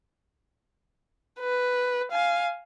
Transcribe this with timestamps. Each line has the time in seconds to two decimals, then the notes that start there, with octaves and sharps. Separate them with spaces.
1.40 B4
2.11 F5 G#5